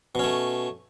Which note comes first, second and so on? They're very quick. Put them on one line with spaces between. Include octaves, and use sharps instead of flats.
B2 C#4 A3